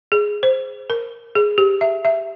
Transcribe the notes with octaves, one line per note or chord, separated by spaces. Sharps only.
G#4
C5
A#4
G#4
G4
E5
E5